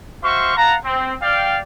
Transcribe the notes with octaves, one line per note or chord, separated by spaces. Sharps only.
F#4 C5 E5 F5 C6 C#6
F5 F#5 A5 A#5
C4
D5 F5 G5